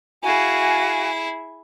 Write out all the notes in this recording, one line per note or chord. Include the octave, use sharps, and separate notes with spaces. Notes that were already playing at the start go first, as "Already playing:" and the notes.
E4 F#4 G#4 F5 G#5